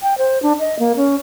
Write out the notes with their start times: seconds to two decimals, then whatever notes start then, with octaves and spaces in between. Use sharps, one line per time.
0.02 G5
0.18 C5
0.42 D4
0.59 D#5
0.79 A#3
0.96 C#4